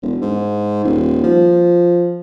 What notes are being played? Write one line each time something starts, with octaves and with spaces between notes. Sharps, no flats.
E1
G#2
D#1
F3